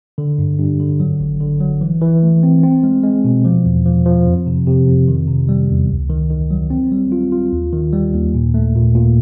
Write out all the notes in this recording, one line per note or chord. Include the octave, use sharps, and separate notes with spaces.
D3
G2
G2
D3
F#3
G#1
D3
F#3
E3
E3
A3
C4
C4
G#3
G#3
B2
F3
E2
F3
F3
F2
C3
C3
F2
D#3
C3
G3
E2
C#2
D#3
D#3
F#3
C4
G3
F4
F4
D#2
D#3
G3
D#2
A#2
A3
A#2
A#2